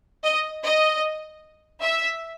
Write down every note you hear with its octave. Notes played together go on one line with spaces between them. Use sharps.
D#5
D#5
E5